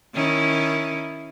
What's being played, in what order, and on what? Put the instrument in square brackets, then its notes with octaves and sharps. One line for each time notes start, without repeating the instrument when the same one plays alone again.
[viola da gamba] D#3 C#4 E4